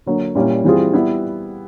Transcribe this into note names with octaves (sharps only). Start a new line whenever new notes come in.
D3 F#3 A#3
A#2 G3 A#3 C#4 E4
E3 G3 C4 F4 G#4
G3 B3 E4